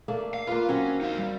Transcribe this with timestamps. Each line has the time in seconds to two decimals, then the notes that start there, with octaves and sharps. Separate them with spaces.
0.08 A3 A#3 D4
0.34 F5
0.47 A#3 F4 B4
0.69 F#3 C4 C#4 F#5
1.01 D#4 F5
1.18 G3